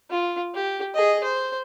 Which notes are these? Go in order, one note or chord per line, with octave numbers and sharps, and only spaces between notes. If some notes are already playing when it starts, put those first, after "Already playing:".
F4
G4
G#4 D#5
C5